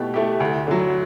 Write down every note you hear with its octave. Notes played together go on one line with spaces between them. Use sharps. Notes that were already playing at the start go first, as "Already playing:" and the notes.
Already playing: B2 A3 E4 G4
A3 E4 G4
D2
D3 F#3